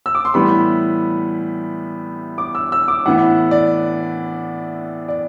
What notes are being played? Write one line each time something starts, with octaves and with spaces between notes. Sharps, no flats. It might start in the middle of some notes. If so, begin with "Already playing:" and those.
E6
D6
C6
A2 E3 G3 B3 B5
D6
E6
E6
D6
A2 E3 B3 F#5
D5
D5